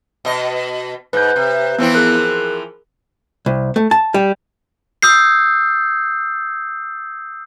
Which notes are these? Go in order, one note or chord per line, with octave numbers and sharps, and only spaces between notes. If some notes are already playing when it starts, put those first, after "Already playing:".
B2 D#5
G#2 B4 G6
C3
E3 F3 B3 C4 E4
G#4 A#4 F#6
C2
A3
A5
G3
D#6 E6 G6 C7